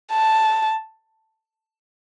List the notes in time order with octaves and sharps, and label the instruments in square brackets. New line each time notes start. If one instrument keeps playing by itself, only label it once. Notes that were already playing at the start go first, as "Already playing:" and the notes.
[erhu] A5